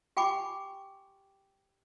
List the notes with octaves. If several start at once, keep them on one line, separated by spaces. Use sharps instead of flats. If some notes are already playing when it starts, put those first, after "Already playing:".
G4 G5 G#5 B5 D6